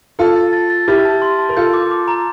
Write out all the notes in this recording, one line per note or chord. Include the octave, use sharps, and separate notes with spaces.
F4 A4 A5
A6
A6
A6
E4 G4 F6
A5
C6
A5
A#4
F4 A4 G6
D6
D6
A#5